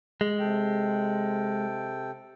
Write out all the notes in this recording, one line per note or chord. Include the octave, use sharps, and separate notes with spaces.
G#3
C3 A4 G5